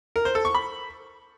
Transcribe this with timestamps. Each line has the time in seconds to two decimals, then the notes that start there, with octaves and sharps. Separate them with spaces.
0.16 A#4
0.25 C5
0.35 A4
0.45 C#6
0.55 B5